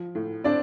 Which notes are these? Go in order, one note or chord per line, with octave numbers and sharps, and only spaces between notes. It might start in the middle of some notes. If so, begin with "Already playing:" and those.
Already playing: F3
A2
C4 D4 D5